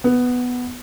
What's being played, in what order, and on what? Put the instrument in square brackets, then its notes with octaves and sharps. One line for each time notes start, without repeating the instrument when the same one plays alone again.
[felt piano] B3